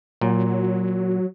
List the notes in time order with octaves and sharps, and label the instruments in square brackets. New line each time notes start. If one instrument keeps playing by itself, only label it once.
[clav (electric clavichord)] A#2 [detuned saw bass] F#3